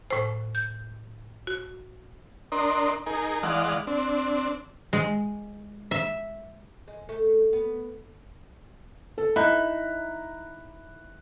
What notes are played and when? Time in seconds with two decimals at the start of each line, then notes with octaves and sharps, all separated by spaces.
0.10 A2 C5
0.55 G6
1.47 F#4
2.52 D4 A#4 D#5 C6
3.06 D#4 G#4 A#4
3.43 E3 G#3 D5 D#5 F5 F#5
3.87 C4 D4
4.93 G#3
5.91 E5
6.88 G#3
7.09 A3
7.53 B3
9.18 A4
9.36 D#4 E4 A#5 F#6